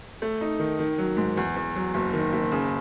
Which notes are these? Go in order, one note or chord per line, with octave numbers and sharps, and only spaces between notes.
A3
D#4
D#3
D#3
F#3
G#2
E2
E2
F#3
F#1
D#3
F#1
C#3